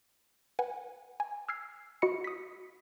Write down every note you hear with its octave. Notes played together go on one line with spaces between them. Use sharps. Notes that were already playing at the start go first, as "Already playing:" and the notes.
B4 F#5 G#5
G#5
E6 F6 G#6 C7
F#4 D#5 B5 C#7
D#6 B6